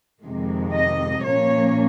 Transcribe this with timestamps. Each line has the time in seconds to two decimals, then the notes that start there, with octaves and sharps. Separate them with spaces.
0.22 F2 C3 D#3 G#3
0.74 D#5
1.25 A#2 F3 A#3 C#4 C#5